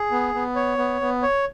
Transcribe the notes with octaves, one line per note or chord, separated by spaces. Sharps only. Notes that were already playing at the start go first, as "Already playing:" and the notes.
Already playing: G#4
B3
B3
C#5
B3
B3
C#5